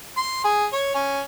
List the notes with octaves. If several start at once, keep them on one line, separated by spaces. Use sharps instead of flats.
C6
G#4
C#5
C#4